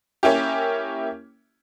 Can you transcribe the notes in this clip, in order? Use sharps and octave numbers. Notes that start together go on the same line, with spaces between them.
A#3 C#4 E4 G4